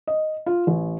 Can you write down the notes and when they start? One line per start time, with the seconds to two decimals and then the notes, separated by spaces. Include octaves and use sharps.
0.07 D#5
0.46 F4
0.67 A1